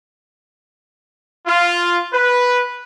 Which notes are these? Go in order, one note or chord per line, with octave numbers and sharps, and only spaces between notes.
F4
B4